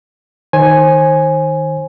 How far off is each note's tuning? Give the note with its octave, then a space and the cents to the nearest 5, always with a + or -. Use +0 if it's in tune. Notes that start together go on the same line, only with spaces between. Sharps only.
D#3 +0 C5 +35 G#5 +0